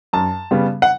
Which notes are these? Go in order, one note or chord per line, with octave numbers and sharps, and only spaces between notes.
F#2 A5
C#3 G3 B3
F#5